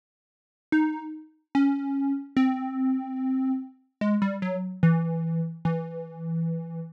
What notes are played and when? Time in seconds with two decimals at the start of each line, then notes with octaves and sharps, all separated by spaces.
0.72 D#4
1.55 C#4
2.37 C4
4.01 G#3
4.22 G3
4.42 F#3
4.83 E3
5.65 E3